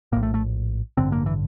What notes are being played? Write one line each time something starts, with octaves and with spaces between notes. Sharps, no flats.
A#1 A2 A#3
A3
A3
A1 G2 D3 C4
A#3
E3